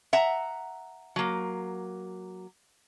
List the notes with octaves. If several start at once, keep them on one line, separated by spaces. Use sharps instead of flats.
E5 F#5 A#5
F#3 A#3